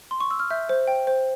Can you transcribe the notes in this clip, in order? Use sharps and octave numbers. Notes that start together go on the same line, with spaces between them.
C6
C#6
E6
F6
E5 G6
C5
G5
C5